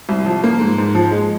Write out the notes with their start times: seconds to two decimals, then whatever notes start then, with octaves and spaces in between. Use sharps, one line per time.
0.09 C2
0.26 F3
0.44 A#3
0.60 G#2
0.78 G#2
0.95 F3
1.11 G#3